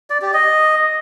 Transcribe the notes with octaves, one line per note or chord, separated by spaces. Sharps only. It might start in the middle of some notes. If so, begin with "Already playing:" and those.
D5
G4
D#5